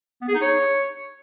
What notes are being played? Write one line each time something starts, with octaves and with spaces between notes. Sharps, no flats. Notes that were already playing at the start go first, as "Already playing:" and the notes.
B3
G#4
D#4
C#5